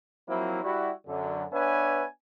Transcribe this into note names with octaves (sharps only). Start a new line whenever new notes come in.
F3 F#3 A#3 C4 E4
G3 E4 F#4
F#2 D3
B3 D4 B4 C#5 E5 G#5